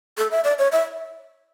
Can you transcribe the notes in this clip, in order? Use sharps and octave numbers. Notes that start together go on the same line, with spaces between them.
A4
E5
D5
C#5
E5